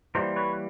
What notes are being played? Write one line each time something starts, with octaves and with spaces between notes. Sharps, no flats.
E3 G3 A#3 A#4 C5
B4 C#5